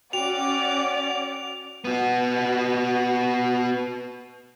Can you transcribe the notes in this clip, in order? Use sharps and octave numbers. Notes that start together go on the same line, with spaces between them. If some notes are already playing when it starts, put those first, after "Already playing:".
C#4 F#4 D5 F#5 G5 D6 F7
B3 F#4